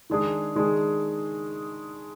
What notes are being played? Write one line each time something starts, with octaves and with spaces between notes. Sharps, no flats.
D#3 G#3 D4 G#4
D#3 G#3 D4 G#4